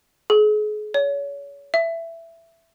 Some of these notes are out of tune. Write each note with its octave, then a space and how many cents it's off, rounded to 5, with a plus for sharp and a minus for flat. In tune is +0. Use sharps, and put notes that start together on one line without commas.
G#4 +35
C#5 +30
E5 +15